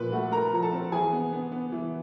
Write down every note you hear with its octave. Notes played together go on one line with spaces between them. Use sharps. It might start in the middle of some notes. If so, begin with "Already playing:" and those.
Already playing: A#2 F3 B4 B5
A3 F#4 F#5
A3 A#4 A#5
F3 A#5
A4 A5
C4
E3 G#4 G#5
B3
B3
B3
E3